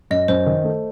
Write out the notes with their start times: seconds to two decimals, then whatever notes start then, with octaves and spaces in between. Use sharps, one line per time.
0.11 F#2 D#5
0.28 F#2 C5
0.46 D#3
0.64 A3